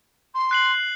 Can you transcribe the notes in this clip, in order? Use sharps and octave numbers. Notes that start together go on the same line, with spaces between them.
C6
F#6 C7 F#7